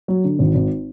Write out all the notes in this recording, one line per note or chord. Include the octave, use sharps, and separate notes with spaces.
F#3
D3
G#1
G#1